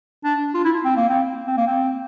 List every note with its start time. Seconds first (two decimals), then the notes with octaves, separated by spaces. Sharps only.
0.24 D4
0.54 F4
0.65 E4
0.85 C4
0.97 A#3
1.09 C4
1.47 C4
1.57 A#3
1.67 C4